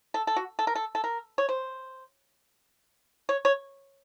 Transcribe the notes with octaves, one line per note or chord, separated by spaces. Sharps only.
A4
A4
F#4
A4
A#4
A4
A4
A#4
C#5
C5
C#5
C#5